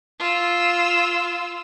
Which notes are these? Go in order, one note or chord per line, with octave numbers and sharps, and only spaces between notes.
F4 E6